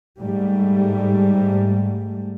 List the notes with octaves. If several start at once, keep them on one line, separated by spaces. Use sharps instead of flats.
G#2 G3 A3